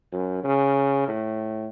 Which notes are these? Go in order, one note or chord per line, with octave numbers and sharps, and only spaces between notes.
F#2
C#3
A2